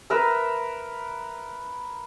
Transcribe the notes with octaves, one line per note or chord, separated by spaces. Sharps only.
A#4 B4 E5 A#5